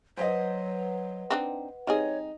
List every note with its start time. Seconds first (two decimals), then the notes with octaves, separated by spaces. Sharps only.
0.17 F#3 B4 C5 D#5 F#5
1.30 C4 D4 D#4
1.87 G3 C4 D#4 G#4 C#5